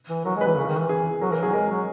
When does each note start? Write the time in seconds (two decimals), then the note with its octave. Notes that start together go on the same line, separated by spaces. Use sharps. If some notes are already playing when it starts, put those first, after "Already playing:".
0.09 E3
0.25 F#3 A#4
0.36 G#3
0.41 B4
0.46 E3
0.57 C#3 A#4
0.68 D#3
0.78 E3
0.89 G#4
1.21 F#3 A#4
1.32 E3 A#4
1.43 F#3 G#4
1.53 G#3 A#4
1.70 F#3